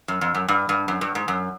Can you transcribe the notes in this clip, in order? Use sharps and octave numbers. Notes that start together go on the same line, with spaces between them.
F#2
F2
F#2
G2
G2
F#2
G2
G#2
F#2